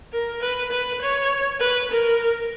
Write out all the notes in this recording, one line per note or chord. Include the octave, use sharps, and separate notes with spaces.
A#4
B4
B4
C#5
B4
A#4